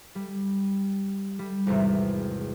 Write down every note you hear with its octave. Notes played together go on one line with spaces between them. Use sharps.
G3
G3
G#1 E2 C3